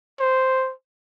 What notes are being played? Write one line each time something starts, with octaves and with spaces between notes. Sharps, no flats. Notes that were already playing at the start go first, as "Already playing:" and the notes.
C5